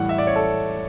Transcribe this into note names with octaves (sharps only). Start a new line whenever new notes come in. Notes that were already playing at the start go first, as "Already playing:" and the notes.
Already playing: A2 E3 G3 F#5
E5
D5
C#5
A4